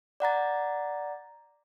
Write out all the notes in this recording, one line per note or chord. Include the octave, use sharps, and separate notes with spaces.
D5 F#5 A#5 A6